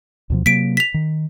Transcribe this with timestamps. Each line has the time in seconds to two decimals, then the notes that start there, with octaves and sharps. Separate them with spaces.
0.30 D2 B2 F3
0.46 C3 F#3 A#3 B6 D7
0.77 B6 F7
0.94 D#3